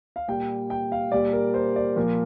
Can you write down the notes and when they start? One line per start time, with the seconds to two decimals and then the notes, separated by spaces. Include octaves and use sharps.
0.16 F5
0.28 A#2 G3 G5
0.70 G5
0.92 F5
1.12 A#2 G3 D5
1.33 A#4
1.54 C5
1.76 D5
1.96 A#2 F3 A#4